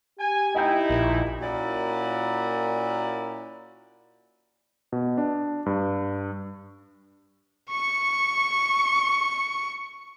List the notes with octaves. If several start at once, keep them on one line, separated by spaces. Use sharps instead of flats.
G4 G#5
D#4 E4 D#5 G5 G6
A#1 A#2
A#2 A#3 C#4 E4 F#4 D5
B2
D4
G2
C#6 C#7